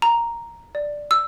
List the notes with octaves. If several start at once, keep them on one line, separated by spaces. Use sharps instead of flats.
A#5
D5
E6